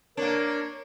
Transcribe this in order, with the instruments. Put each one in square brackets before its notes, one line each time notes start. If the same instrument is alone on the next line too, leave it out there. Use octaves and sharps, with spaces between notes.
[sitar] A#3 D4 [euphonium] A#4 [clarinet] C#5